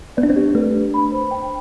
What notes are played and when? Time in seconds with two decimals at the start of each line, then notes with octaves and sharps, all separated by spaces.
0.17 B3 D5
0.23 D4
0.30 C4
0.36 G4
0.55 A3 B4
0.74 D4
0.94 B5
1.12 C5
1.31 G5